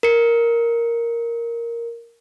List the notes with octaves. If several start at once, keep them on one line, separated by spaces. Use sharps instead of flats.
A#4 C#7